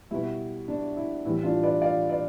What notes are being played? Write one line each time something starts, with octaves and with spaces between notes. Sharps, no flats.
B2 G3 E4
D4
E4
A2 E3 G3 E4
D4 F4
B4 D5
D5 F5
B4 D5